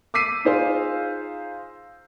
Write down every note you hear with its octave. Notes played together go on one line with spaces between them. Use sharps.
D6 E6 B6 C7 D#7
D#4 F4 G#4 C5 F5